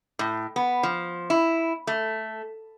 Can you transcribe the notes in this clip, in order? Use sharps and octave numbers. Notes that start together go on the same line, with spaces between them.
A2
B3
F3
E4
A3